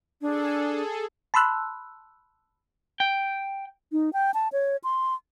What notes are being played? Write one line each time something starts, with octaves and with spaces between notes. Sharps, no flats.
D4 G#4 A4
A5 B5 C6 E6 F#6
G5
D#4
G5
A5
C#5
C6